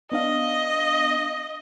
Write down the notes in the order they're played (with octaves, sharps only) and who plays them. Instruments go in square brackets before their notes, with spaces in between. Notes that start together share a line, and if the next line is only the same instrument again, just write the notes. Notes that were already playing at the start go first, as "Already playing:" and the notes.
[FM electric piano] B3 D4 F5 [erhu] D#5